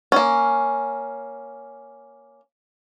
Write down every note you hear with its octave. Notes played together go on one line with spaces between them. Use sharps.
A#3 C#4